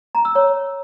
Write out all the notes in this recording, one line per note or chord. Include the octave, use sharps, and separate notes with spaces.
A#5
E6
C#5